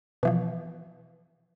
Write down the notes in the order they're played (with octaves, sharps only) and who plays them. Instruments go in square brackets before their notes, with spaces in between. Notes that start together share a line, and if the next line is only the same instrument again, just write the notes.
[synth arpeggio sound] B2 E3 F3